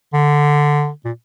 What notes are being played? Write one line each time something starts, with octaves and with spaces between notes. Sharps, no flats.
D3
A#2